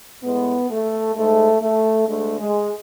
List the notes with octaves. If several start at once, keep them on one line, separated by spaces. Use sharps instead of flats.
A2 G#3 B3
A3
G#2 G#3 A3
A3
D2 D3 G#3 A3
G#3